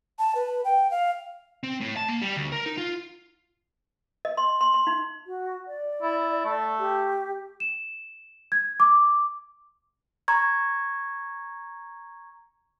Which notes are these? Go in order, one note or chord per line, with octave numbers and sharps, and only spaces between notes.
A5
B4
G5
F5
C4
A2
A5
A#3
G3
D2
A#4
D#4
F4
D#5
C6
C6
C6
D#4
F#4
D5
E4
A3
G4
E7
G#6
D6
A#5 C#6 G#6